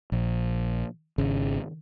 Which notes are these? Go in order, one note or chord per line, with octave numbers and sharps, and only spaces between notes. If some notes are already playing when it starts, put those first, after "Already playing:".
A#1
G#1 C#3